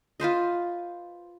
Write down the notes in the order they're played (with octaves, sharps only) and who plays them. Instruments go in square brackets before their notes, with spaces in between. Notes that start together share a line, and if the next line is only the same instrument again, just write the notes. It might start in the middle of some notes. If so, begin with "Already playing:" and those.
[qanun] F4 B4 C5 D#5